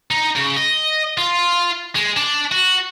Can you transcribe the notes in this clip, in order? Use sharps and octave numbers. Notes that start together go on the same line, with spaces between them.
D#4
C#3
D#5
F4
G#3
D4
F#4